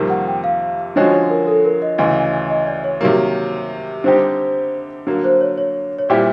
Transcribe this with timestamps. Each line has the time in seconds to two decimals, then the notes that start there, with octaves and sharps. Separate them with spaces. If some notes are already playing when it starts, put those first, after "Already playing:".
Already playing: F2 C3 D#3 G3 A#3
0.10 F#5
0.27 G5
0.44 F5
0.96 D3 F3 G#3 C#4 F#4 D#5
1.13 C#5
1.30 A#4
1.47 A4
1.65 A#4
1.82 D#5
1.98 D2 C#3 E3 D#5
2.50 D#5
2.67 D5
2.84 C#5
3.01 C3 D#3 F#3 A#3
4.04 D3 G3 C4 D#4 G4 C5
5.07 D3 F#3 A#3
5.24 C5
5.41 C#5
5.58 C#5
5.98 C#5
6.09 A#2 G3 C4 E4 G4 D5